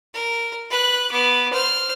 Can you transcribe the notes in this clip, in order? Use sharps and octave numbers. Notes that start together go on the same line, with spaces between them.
A#4
B4 F#6
B3 D6
C5 F6